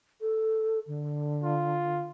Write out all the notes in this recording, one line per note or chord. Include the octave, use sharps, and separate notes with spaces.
A4
D3
F4